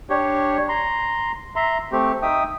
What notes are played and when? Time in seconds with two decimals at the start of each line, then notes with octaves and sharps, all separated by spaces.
0.10 D4 G4 C#5
0.69 A#5 C6
1.56 E5 A#5 C6
1.92 A3 C4 G4
2.22 D#4 E5 G5 D#6